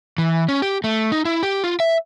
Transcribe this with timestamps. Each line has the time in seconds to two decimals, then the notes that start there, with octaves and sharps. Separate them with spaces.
0.18 E3
0.49 C#4
0.62 G4
0.84 A3
1.12 D#4
1.25 E4
1.43 G4
1.64 F4
1.80 E5